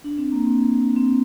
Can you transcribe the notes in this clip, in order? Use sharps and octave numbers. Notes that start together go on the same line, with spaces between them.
D4
C4
A#3
C4
C4